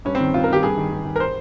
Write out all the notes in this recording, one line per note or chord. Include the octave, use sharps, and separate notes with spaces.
G2 C#4
C4
D#3
G2 F4
A#4
D#3 G4
G2 G#4
D#3
G2
D#3
A#4
C5